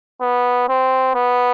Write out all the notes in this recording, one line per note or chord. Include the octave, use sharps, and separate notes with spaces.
B3
C4
B3